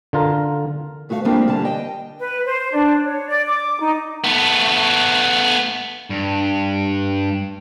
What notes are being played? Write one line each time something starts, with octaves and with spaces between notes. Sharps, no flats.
D3 F4 A#4
G2 A3 F#4 G#4 F5
F3 G3 A3 A#3 C4 D4
D3 G3 A5
D#5 G5
B4
C5
D4
C#5
D5
D6
D#4
A3 B3
G2